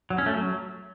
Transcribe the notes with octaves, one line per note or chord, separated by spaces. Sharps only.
F#3
C#4
A3
F#3